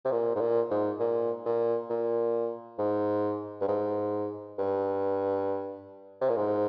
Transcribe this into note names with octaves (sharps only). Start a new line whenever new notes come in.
C3
A#2
G#2
A#2
G#2
A#2
A#2
A#2
G#2
G2
G#2
G2
C3
A#2
G#2